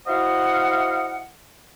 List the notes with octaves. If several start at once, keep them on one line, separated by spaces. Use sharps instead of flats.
E4 F#4 C5 D#5 F5 F#5